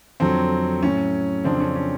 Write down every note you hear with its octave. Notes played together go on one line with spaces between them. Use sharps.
F2 D3 F#3 C4
A2 F#3 C#4
F2 C#3 F#3 C4 D4
C#4
C#4